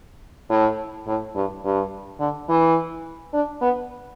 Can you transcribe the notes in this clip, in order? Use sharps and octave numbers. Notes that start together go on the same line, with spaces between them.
A2
A2
G2
G2
D3
E3
D4
B3